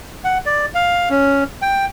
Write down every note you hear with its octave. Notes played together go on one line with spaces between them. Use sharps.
F#5
D5
F5
C#4
G5